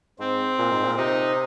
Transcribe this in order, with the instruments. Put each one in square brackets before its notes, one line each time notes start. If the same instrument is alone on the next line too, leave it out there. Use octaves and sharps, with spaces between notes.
[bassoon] G#2 [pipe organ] C4
[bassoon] A#2
G#2
A#2
[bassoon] C3 [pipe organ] D#4